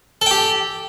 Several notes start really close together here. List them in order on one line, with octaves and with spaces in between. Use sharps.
A4 G5 G4